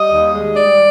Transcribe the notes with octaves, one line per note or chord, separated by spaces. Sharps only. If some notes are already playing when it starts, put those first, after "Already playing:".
Already playing: G3 D#5
D#2
G#3
G3 D5